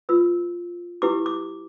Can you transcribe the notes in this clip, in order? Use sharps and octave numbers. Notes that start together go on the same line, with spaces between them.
F4 B4 E6
E4 G4 B4 D6
D6